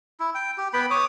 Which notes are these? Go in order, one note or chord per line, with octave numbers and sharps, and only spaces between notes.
E4
G5
G4
B3 G5 B5
C#5 D6 D#6